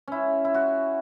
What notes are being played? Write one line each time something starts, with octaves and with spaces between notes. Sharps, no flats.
C#4 E4
E4
F#4